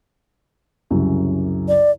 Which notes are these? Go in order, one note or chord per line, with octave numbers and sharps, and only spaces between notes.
C2 F#2 C#3
D5